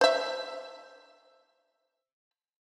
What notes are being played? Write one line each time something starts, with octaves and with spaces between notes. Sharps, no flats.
C5 E5